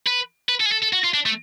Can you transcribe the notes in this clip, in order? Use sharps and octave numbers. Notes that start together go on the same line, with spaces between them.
B4
B4
A4
G#4
A4
A4
F#4
F4
D4
A3